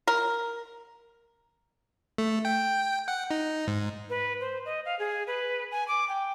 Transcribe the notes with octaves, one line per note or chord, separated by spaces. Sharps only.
A#4
A3
G5
F#5
D#4
G#2
B4
C5
D#5
F5
G#4
B4
G#5
D6
G5